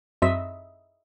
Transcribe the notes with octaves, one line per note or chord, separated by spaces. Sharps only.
F#2 C4 D#5 E5 B6